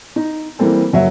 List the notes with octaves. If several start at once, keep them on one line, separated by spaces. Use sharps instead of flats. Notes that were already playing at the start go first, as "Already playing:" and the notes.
D#4
E3 G3 A#3 C4 A4
F#1 F#3 E5